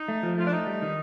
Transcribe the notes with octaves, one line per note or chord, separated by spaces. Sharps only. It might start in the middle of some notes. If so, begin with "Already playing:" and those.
Already playing: D#4
A3
F3
A3 F4
D4
A3 D#4
G3
D#3